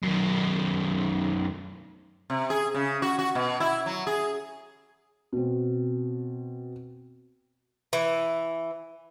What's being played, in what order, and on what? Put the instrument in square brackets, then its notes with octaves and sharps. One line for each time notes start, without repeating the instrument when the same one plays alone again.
[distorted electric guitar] F#2 D#3
[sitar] C3
G#4
C#3
F#4
F#4
B2
E4
F#3
G#4
[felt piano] B2 C4
[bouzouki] E3